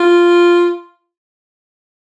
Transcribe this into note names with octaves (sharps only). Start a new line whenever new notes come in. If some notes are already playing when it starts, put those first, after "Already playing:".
Already playing: F4